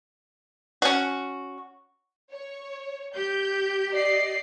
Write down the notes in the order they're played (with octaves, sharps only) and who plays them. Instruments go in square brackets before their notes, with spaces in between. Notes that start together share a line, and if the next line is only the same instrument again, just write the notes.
[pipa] C#4 F#4
[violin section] C#5
[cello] G4 [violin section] G6
[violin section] D5 D#5 C7